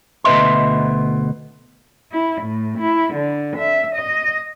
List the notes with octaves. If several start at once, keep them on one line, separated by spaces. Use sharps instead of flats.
D2 B2 B4 D#5 E5 C6
E4
A2
E4
D3
E5
D#5